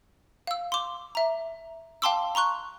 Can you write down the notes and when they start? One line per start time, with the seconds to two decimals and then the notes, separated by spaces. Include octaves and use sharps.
0.47 F5 E6
0.72 C6 D6
1.15 E5 A#5
2.02 F5 G5 A5 C6 D6 E6
2.35 A#5 C6 C#6 F#6